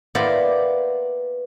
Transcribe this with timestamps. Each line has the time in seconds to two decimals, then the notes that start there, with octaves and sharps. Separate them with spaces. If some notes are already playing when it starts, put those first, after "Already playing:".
0.15 A#3 B3 E4 C5 D5